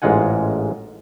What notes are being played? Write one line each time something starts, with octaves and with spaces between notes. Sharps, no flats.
A1 G#2 G#3 F4 F#5 G#5